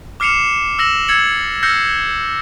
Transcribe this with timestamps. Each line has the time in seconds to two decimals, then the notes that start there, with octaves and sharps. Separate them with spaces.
0.20 D6 F6 C7 C#7 E7 F7
0.79 E6 F6 A#6 E7 F#7
1.08 E6 G#6 A6 C#7 F#7
1.63 E6 F6 G6 A#6 C7 C#7